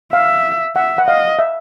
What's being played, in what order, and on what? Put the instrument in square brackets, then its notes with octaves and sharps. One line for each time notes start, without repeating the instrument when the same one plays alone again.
[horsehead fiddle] E5 [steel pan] F5
[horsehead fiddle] E5 [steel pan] F#5
[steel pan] F#5
[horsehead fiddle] D#5 [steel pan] F5
[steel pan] E5